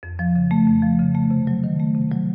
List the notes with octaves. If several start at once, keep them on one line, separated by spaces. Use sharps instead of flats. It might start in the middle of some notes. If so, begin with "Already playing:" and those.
F2
F3
C#3
A3
F2
F3
C#3
A3
C3
F#3
D#3
A3
C3
F#3